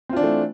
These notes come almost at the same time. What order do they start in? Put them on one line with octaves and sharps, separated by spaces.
C4 F4 D4 E3 A3